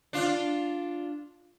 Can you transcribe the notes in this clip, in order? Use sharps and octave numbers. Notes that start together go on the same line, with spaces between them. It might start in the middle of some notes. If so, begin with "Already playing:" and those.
D4 F4